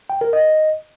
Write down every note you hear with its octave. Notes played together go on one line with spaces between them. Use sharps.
G5
A#4
D#5